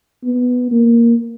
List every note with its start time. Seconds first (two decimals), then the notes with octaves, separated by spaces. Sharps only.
0.24 B3
0.71 A#3